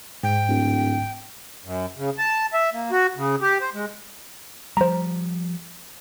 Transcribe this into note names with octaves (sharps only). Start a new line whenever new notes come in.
G#2 G5
D1
F#2
C#3
A5
E5
A#3
F#4
C#3
G4
C5
G#3
F3 G3 C5 A#5